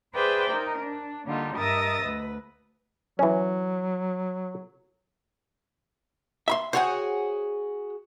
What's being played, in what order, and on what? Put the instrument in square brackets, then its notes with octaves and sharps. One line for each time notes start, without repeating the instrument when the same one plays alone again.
[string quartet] G#4 B4 C5 D5 E5 G5
D#4 A#4
D4
D3 G3 A#3 D#4 F4
G2 A#4 D#5 E5 D#6 A6
D2 B4
[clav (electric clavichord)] E3 C#4 [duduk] F#3
[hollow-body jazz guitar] E5 B5 C6
[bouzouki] F#4 G#4 [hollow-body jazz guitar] C5 C#5 F#5